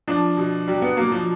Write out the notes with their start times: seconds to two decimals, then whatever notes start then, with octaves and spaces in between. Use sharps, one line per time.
0.08 F3 D4
0.37 B2
0.68 F#3 G3
0.82 B3
0.97 F#3 A#3
1.12 F3